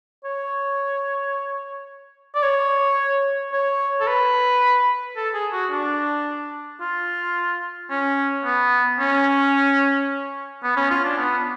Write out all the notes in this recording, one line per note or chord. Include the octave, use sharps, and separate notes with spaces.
C#5
D5
C#5
C#5
A4
B4
A4
G#4
F#4
D4
F4
C#4
B3
C#4
B3
C#4
F4
D4
B3